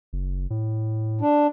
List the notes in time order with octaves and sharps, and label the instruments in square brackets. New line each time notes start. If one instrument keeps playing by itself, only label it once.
[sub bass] F#1
A2
[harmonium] D4